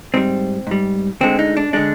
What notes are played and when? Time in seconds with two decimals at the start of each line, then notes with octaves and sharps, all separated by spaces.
0.14 G#2 G3 C4
0.67 G#2 G3
1.21 D2 D3 G#3 C4
1.39 D#4
1.57 D4
1.73 D3 G#3 D4